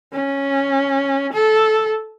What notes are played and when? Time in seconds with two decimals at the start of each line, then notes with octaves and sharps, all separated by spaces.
0.13 C#4
1.33 A4